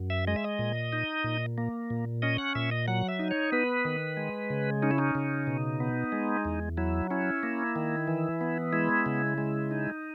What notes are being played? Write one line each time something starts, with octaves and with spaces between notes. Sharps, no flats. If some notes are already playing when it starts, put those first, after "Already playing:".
Already playing: F#2
E5
G#3 D#5
E5
D#5
A#2
D#4
A#2
A#3
A#2
C#4 D#5
F#5
A#2 E5
D#5
F#3 F#5
E5
D#4
C#5
B3 B4
D#3
G#3
C#3
C#4 D#4
E4
D#4
C#3
B2
B3
G#3
E2
F#3 E4
C#4 E4
A#3
D#3
E3
B3
G#3 E4
C#3
G#3
D#4